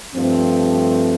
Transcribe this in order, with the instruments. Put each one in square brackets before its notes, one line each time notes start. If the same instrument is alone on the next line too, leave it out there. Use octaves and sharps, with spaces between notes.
[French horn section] G2 F3 A3 C4